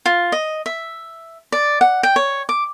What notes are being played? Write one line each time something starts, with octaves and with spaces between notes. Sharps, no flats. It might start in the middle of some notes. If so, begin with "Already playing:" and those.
F4
D#5
E5
D5
F#5
G5
C#5
D6